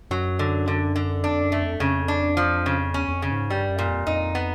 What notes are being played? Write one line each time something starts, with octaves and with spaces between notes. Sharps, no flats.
F#2 F#3
D3
D3
D3
F2 D4
F#2
A3
F2
F2 C#3
D4
F3
C#3
E2 C#4
E2
F2
C#3
G#2
G2 G3
F#2
A#2
F2
F2 D#4
B3